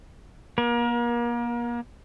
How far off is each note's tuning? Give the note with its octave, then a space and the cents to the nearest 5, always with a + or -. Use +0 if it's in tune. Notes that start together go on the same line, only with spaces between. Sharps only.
A#3 +40 A#4 +30